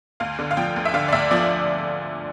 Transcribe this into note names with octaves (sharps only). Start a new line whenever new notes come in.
D2 F5
D3
F5
F3 G5
D2
E5
D3 F5
D5
D2 E5
F3 D5